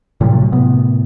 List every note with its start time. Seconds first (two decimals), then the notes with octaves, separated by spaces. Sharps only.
0.21 A2 C3 F3 F#3
0.52 A2 C3 B3